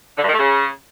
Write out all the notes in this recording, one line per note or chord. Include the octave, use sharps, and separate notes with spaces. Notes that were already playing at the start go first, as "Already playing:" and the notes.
D3
G2
D#3
A3
C#3